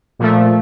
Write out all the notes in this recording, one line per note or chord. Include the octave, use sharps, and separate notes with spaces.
A#2 F3 A3